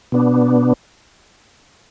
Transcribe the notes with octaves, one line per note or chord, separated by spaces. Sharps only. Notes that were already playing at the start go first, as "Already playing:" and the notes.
B2 B3 D4